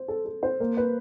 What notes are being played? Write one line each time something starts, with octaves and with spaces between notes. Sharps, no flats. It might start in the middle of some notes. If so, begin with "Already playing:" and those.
Already playing: C5
A4
A4
C5
A#3
B4